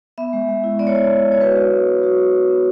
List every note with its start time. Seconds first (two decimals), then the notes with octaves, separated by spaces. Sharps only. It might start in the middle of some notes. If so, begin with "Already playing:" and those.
0.18 B3 E5
0.33 G#3
0.48 G#3
0.64 E4
0.79 B3 D5
0.87 C#5
0.95 G#3 D5
1.10 G#3
1.26 E4
1.32 C#5
1.41 F#4 B4
1.56 F#4
1.72 B3
1.88 B3
2.03 F#4
2.18 F#4
2.33 B3
2.49 B3